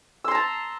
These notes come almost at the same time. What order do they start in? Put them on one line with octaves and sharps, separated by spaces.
E6 C6 A#5 A5